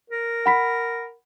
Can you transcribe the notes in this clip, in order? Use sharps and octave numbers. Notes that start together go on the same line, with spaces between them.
A#4
F#5 B5 B6